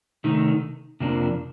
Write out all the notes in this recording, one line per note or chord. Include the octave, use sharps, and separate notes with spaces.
C3 D#3 A3 D#4
F2 C3 F3 A#3 D4